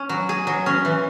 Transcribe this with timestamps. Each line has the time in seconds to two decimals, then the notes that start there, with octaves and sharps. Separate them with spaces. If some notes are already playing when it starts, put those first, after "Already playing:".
Already playing: C#4
0.09 F#3
0.29 G#4
0.47 F#3
0.66 C#4
0.85 E3